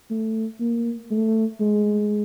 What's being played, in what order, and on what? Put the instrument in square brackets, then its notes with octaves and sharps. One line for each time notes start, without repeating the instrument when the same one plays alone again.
[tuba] A3
A#3
A3
G#3